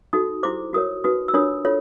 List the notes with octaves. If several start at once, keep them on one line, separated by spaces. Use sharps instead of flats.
D#4 F#4 A4 D#6
E4 G4 C5 D6
F#4 A#4 C#5 D#6
D#4 F#4 B4 D#6
E6
D4 F4 A#4 C#5 D#6
F4 A4 C#5